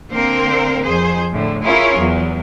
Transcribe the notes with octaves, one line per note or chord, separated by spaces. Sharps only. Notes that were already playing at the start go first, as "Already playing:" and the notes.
D3 A#3 C4 A#4 C5
F2 G#4 C5
A2 D3
C#4 E4 F4 G#4 A#4 C#5
E2 F#3